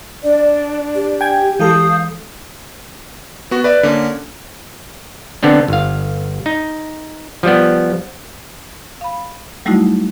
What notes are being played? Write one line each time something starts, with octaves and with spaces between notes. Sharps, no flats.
D4 D5
G4
G5 G#5 G#6
E3 G#3 A4 F5 D#6 G6
B3 F#4
B4 D5 E5
D3 A#3 C#4
D3 B3 C4 D4
G1 F5
D#4
F3 G3 B3
F5 B5
F#3 G3 A3 D#4 E4 F#4